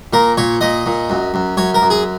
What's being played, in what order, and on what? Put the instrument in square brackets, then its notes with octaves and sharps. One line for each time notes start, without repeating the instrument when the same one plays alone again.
[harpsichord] A#2 A#4
A#2 C#5
A#2 D#5
A#2
F#2
F#2
F#2 C#5
A#4
F#2
G#4